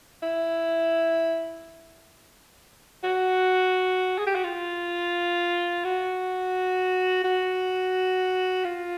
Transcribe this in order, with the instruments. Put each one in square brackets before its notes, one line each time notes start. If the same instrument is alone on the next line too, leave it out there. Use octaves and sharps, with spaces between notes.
[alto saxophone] E4
F#4
G#4
G4
F#4
F4
F#4
F#4
F4